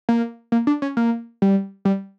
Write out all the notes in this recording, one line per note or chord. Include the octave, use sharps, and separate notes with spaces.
A#3
A#3
D4
C#4
A#3
G3
G3